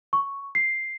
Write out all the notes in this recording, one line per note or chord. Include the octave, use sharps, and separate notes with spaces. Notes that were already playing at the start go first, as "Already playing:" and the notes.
C#6
C7